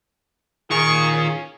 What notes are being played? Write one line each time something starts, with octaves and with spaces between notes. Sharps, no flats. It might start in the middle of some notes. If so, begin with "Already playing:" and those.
D#3 F4 G#4 A#4 C#6
C#4